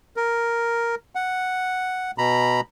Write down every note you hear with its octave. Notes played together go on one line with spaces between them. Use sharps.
A#4
F#5
B2 A#5 B5